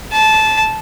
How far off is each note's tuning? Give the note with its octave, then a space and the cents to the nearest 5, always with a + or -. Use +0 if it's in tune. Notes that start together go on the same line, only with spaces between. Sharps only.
A5 -15